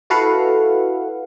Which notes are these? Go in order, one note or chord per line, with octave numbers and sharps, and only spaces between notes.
E4 F#4 A4 B4 F5 F#5